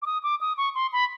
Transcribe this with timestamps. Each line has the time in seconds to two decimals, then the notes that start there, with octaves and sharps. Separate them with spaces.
0.02 D6
0.06 D#6
0.23 D6
0.41 D#6
0.57 C#6
0.75 C6
0.93 B5